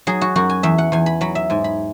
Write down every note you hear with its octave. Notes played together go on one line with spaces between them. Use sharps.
F#3 G#4
F#4
F#2 F#4
G#5
E2 E5
F#5
E2 G#5
B5
F#3 B5
E5
G#2 G#5
B5